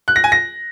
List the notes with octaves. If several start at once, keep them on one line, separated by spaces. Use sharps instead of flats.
F#6
A#6
G#5
A#6